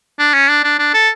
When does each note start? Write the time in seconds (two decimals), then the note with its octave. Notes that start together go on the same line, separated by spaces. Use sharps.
0.19 D4
0.34 C#4
0.49 D4
0.64 D4
0.79 D4
0.94 A4